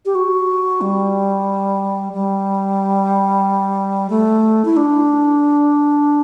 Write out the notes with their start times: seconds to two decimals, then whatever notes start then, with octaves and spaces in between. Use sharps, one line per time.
0.06 G4
0.15 F#4
0.81 G3
2.13 G3
4.10 A3
4.65 E4
4.77 D4